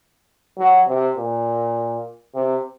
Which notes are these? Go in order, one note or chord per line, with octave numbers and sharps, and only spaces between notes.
F#3
C3
A#2
C3